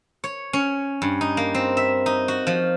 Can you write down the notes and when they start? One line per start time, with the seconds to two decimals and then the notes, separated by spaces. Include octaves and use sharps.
0.24 C#5
0.53 C#4
1.02 G2
1.21 D#4
1.37 A#3
1.55 C4
1.77 E5
2.06 D#4
2.28 F#4
2.47 F3